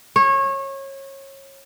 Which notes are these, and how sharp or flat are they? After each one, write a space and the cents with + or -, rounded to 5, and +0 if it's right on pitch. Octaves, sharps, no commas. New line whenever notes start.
C#5 -25